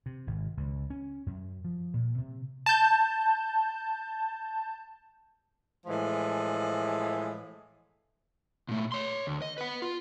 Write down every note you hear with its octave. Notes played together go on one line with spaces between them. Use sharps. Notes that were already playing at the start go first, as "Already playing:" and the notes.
C3
G#1
C#2
C#4
F#2
F3
A#2
C3
A5 G6
A2 E3 F3 G#3
A#2 A3
C#5 C6
D2
D#5
B4 F#5
F4